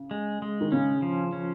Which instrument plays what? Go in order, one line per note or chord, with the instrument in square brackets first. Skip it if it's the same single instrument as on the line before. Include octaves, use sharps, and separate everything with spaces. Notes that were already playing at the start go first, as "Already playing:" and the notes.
Already playing: [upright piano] C#3
[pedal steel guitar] G#3
G#3
[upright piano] D#3
[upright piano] C#3 [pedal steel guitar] C#4
[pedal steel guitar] F3
C#4